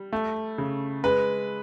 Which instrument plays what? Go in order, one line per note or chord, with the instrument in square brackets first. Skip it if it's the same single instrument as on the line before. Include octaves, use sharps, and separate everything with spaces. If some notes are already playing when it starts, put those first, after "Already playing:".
Already playing: [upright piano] G3
A3
C#3
G#3 B4